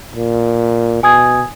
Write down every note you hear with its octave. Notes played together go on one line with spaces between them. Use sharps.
A#2
B2 G#5 D#6 G#6